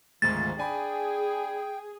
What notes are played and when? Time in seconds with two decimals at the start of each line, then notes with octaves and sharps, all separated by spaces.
0.22 G#1 D2 G#2 F3 A6
0.58 D4 G#4 G5 G#5 B5